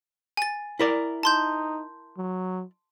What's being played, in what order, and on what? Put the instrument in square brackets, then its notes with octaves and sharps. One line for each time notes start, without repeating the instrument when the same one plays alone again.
[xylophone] G#5 A6
[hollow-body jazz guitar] E4 A#4 D5
[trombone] D#4 [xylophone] A5 C6 G6
[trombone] F#3